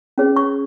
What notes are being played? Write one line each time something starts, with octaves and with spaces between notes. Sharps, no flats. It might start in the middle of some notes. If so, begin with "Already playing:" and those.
C#4 G#4 C#5
C#6